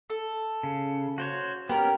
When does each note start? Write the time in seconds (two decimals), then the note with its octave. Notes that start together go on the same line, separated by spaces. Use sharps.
0.10 A4
0.63 C#3
1.18 F#4 C5 C#5
1.69 B3 C#4 G4 A#4